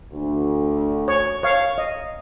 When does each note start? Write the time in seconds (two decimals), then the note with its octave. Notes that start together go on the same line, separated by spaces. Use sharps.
0.12 D2
1.08 C#5
1.43 C#5 F5
1.78 D#5